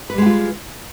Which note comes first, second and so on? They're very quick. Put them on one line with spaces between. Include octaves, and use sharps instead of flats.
B4 G3 G#3 F#4 F4